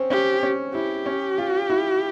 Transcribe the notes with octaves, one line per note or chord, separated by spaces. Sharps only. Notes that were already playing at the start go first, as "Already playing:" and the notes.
Already playing: C4 C#4
C#4 G4
C#4
E4 G4
C#4
F4
E4